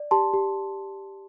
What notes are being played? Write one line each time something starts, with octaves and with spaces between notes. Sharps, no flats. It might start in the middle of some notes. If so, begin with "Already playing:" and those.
Already playing: D5
G4 A5 C6
G4